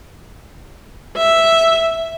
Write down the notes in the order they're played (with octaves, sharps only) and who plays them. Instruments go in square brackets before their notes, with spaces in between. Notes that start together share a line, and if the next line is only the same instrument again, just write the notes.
[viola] E5